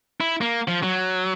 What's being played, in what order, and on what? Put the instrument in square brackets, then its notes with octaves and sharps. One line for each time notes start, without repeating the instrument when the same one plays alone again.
[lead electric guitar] E4
A#3
F3
F#3